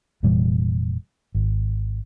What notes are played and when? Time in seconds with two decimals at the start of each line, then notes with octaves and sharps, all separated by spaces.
0.23 F1 A#2 E3 G3
1.35 G#1